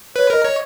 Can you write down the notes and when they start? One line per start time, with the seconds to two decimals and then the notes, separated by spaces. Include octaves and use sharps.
0.15 B4 C#5
0.29 A#4 D#5
0.44 C#5